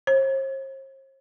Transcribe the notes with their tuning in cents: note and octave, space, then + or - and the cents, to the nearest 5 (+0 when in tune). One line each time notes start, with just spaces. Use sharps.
C5 +45